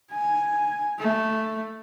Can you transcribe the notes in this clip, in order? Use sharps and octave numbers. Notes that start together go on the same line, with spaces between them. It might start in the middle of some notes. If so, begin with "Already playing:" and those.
G#5
A3